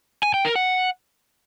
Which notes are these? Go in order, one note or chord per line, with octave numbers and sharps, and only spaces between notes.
G#5
G5
A#4
F#5